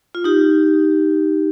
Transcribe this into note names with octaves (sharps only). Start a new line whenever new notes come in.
F4
D#4 G4